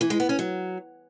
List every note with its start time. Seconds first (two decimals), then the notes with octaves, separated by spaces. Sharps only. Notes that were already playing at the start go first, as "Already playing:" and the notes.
0.01 E3
0.10 G#3
0.20 B3
0.29 C#4
0.39 F#3